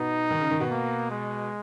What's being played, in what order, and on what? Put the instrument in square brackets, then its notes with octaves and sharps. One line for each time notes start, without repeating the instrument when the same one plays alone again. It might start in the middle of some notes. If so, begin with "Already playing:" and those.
Already playing: [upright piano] B2 B3 [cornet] D#4
[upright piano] D#3
C#3
D#3
B2 B3
[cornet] A#3
G#3